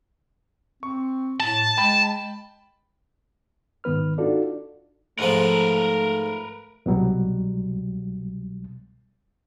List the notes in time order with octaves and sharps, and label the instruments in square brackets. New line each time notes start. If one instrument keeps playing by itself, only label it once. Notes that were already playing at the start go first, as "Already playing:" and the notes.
[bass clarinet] C4 [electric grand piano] C#6
[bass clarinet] A2 [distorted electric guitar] A5
[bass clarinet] G#3 [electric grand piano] G5 B5 A6
[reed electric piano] G#2 D#3 B3 B4 F6
D4 D#4 F4 F#4 A4 D5
[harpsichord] G#2 F3 [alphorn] A3 [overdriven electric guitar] A#4 B4
[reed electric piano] C2 B2 F#3 G3